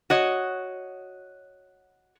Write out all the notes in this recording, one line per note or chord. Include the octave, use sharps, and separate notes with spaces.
F#4 C#5 D#5